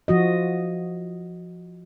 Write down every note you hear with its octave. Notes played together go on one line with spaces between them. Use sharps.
F3 F#4 D#5